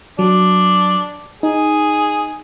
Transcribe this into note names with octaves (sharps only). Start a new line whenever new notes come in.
F#3 D4
D#4 G#4